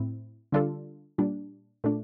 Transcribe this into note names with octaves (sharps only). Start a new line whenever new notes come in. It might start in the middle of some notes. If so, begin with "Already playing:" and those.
Already playing: A2 C4 E4
D3 G3 D4 F4 A4
A#2 G3 D4
A#2 A3 D4